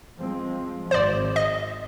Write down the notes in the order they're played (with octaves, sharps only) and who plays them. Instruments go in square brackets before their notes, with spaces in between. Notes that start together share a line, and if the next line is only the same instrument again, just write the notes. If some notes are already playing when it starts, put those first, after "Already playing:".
[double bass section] F3 G#3 C4
[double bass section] G#1 [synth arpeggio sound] C5 D5
[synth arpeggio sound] D#5